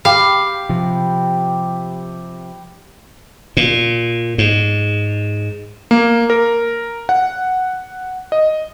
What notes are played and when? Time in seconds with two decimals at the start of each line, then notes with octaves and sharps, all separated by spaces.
0.05 G4 F5 B5
0.69 C3 F3
3.57 A#2
4.38 G#2
5.91 A#3
6.30 A#4
7.09 F#5
8.32 D#5